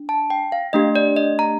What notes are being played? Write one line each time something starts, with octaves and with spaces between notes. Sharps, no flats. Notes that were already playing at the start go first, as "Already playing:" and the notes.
Already playing: D4
A5
G5
F5
A3 D4 G4 D#5
D5
D#5
A#5